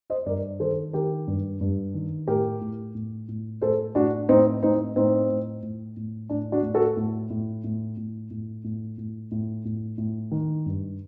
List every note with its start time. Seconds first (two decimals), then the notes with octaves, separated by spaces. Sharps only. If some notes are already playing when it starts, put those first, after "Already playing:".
0.10 C5 D#5
0.26 G2 A#4 D5
0.60 D#3 A4 C5
0.93 D#3 G4 A#4
1.27 G2
1.61 G2
1.94 D#3
2.27 A2 G4 A#4
2.61 A2
2.95 A2
3.28 A2
3.61 A2 A4 C5
3.95 A2 D4 F#4
4.29 A2 C4 D#4
4.62 A2 C4 D#4
4.96 A2 C4 D#4
5.29 A2
5.63 A2
5.97 A2
6.29 A2 D4
6.52 D4 F#4
6.63 A2
6.74 F#4 A4
6.97 A2
7.30 A2
7.64 A2
7.97 A2
8.31 A2
8.64 A2
8.98 A2
9.31 A2
9.65 A2
9.98 A2
10.31 D#3
10.66 G2